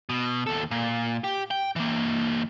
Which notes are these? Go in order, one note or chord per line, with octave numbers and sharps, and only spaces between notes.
B2
D#2 A4
A#2
G4
G5
E3 A#3